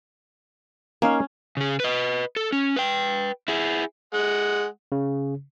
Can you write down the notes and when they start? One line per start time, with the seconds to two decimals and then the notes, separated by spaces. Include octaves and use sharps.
1.02 A#3 C#4 D#4 F5
1.57 C#3 G#4
1.80 B4 D#5
2.36 A4
2.52 C#4
2.76 B4 G5
3.48 E4 G#4
4.14 G#3 F#5
4.92 C#3